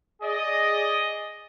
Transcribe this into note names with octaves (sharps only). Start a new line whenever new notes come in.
G#4 D5 D#5